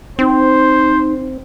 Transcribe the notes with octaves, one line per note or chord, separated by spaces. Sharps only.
C4 D#4 C5